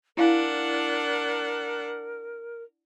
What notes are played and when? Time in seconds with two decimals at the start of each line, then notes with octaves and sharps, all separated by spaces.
0.17 D4 E4 A#4 F5 F#5 G#5